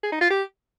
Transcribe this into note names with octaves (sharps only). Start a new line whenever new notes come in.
G#4
D#4
F4
G4